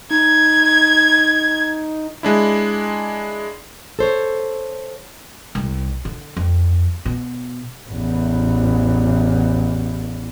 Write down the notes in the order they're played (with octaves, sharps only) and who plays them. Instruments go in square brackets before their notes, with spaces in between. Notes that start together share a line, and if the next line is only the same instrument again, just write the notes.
[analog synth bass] D#4 [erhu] G#6
[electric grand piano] G#3 D4 E4
[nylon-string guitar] A4 C5 C#5
[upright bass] C2
D3
F2
B2
[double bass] A1 E2